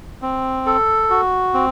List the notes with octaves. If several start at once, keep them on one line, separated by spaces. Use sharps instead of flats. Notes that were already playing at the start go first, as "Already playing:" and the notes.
C4
A4
F#4
C4